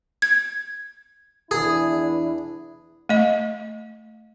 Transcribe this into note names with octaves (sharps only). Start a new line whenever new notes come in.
G#6
E2 D4 E4 G#4
A3 D#5